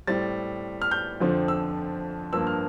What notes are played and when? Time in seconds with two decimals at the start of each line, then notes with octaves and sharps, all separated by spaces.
0.07 A2 G3 C4 A6
0.82 F6
0.91 G6
1.20 F2 D3 F3 C4
1.48 E6
2.33 G2 F3 A#3 E6
2.47 F6